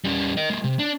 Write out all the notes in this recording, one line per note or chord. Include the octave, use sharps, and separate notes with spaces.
G3 C#4
A#4 D#5
G#3 A#3
C3
D4